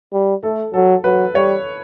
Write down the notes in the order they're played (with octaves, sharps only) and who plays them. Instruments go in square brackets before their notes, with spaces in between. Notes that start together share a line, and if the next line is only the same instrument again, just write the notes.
[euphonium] G3
[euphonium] A3 [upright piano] A4
[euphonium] F#3 [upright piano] A4
[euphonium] F#3 [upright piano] B4
[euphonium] G3 [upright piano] C#5